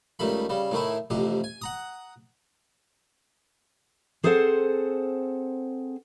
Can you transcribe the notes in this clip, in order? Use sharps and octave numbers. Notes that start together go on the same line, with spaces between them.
C#2 D#3 G3 A3 B5
C#3 G3
A2 D#3 A3 E4
A1 F2 C3 G4
G#5
F#5 A#5 D#6
C4 G#4 A4 C5 E5 F#5